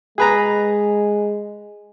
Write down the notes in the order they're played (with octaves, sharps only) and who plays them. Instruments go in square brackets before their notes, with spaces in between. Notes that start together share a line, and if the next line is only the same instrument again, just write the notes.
[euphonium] G#3 [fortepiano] G#4 B4 A#5